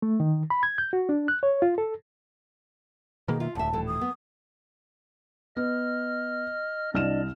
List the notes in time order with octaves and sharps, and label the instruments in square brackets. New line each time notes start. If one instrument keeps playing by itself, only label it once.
[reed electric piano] A3
D#3
B5
G#6
G6
F#4
D4
F#6
C#5
F4
A4
[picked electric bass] B2 D#3 A#3 [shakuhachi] G#4
[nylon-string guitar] F4 [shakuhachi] E5
[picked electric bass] D#1 [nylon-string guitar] D2 E5 [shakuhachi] A5
[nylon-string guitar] A2 E3 A4
[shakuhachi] D#6
[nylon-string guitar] B3
[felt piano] B3 [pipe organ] D#5 F6
[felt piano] C2 F6 E7 [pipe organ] D4 D5 D#5